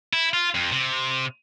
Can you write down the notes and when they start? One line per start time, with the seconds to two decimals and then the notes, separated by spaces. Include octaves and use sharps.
0.13 E4
0.34 F4
0.55 F2
0.72 C3